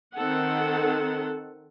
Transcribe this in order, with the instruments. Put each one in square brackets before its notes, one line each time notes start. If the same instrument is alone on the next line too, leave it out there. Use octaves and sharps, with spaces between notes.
[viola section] D#3 C4 A4 F#5